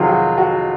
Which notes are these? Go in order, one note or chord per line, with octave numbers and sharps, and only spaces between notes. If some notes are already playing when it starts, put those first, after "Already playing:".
Already playing: F2 C3 D#3 F#3 F4 G#4
F#4
F#4